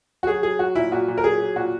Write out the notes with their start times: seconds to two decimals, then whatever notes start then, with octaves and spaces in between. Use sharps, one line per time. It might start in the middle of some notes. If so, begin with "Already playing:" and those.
0.23 F#4
0.27 F#3 G#4
0.43 F#3 G#4
0.59 F#3 F#4
0.75 A#2 E4
0.92 A#2 F#4
1.08 A#2
1.18 A#4
1.24 F#3 G#4
1.40 F#3
1.56 A#2 F#4